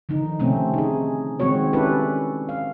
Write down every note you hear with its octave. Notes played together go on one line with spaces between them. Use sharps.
D3 D#3 F3 D#4
C3 A3 C4 C#4
D#4 G#4
D#3 G#3 C4 F#4 C#5
C#4 D4 E4 G4 A4 B4
F5